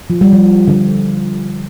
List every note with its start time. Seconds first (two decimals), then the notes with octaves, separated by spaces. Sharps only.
0.10 F3
0.21 G3
0.33 F3
0.68 D3